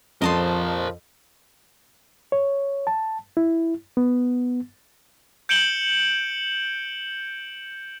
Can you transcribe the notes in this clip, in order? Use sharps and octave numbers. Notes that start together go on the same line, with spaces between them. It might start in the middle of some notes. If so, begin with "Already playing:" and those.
F2 F3 A#4 C5 D#5 A5 C6
C#5
A5
E4
B3
G6 C#7 D7 E7 F#7 G7